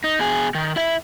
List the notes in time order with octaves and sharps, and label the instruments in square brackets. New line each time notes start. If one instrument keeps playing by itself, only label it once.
[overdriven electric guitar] D#4
B2 G#4
D#3
E4 E5